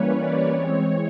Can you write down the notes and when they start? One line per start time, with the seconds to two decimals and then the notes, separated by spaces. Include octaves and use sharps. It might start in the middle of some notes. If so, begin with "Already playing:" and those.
Already playing: E3 G3 A#3 C#4 B4 C#5
0.17 D5
0.52 E3 G#3 C4 C#5